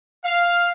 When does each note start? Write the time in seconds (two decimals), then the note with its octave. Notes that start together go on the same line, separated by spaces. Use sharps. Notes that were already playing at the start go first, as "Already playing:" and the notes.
0.24 F5